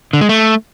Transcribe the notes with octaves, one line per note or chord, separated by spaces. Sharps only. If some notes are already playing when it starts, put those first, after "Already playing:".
D3
G#3
A3